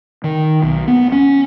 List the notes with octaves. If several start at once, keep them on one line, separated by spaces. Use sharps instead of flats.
D#3
B1
B3
C#4